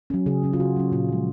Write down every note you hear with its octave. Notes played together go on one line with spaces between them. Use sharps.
F#3 C#4
C#3 G#4
F#3 C#4
F4
C#3 F#4
F#3 C#4
A#2 F4
F3 G#3